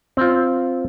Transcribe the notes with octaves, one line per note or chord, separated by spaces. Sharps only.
C4 F4